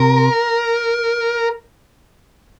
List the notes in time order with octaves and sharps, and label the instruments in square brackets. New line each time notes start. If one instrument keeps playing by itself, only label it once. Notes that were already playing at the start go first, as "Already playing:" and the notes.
Already playing: [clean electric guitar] C3 [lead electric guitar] A#4